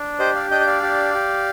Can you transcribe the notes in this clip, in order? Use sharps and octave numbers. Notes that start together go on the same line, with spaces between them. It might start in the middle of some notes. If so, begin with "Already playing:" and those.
Already playing: D4
G4 C5 D#5
D5 F5
D4 D#5 G5
G5
D5 F5
G4
G4